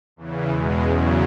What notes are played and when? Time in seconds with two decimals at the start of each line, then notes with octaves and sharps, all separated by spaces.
0.16 E2 C#3 E3
0.49 E2 B2 G#3
0.83 E2 C#3 F#3